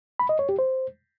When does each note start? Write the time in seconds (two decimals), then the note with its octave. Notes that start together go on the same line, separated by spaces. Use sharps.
0.19 B5
0.29 D#5
0.39 C#5
0.49 G4
0.59 C5